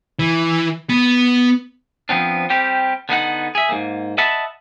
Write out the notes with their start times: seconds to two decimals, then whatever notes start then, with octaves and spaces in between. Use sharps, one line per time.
0.19 E3
0.89 B3
2.09 F3 B3 C4 D4
2.50 G3 C4 G4
3.09 D3 B3 D#4 F#5
3.55 G#4 E5
3.69 G#2 A#3
4.18 D#5 E5 F#5 A5 B5